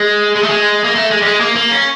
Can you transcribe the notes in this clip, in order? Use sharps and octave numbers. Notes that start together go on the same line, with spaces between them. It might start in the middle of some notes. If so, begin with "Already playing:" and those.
Already playing: G#3
G#3
A3
G#3
A#3
A3
G#3
G3
G#3
A#3
A#3
C#4